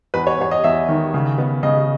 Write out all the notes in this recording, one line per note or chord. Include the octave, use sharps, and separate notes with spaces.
E2 B4
C#5
E2 C#5
D#5
E2 E5
D#3
C#3
B3
C#3 D#5